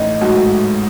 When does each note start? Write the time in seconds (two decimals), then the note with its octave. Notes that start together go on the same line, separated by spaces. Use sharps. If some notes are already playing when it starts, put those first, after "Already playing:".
Already playing: A1 D#4 D#5
0.21 G#2 F#3 A3 F#4